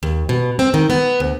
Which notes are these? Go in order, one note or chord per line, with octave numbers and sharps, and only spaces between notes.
D#2
B2
C4
D#3
B3
D2